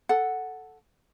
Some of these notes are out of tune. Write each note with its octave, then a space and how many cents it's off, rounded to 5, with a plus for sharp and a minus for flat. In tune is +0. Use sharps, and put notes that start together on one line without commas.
A4 +0 F#5 +0